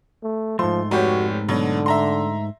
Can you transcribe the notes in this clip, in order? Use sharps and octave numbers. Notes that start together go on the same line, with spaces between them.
A3
G#2 F3 A3 C6
F1 F#4 G4 C#5
B2 D3 F#3
E5 A#5 C6